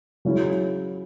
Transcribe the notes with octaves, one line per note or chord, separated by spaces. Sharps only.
C#3 F#3 C#4 E4